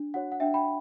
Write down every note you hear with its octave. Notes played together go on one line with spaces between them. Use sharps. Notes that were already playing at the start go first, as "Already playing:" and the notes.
Already playing: D4
F#4 C#5 F#5
F#5
D4 E5 G5
G5 B5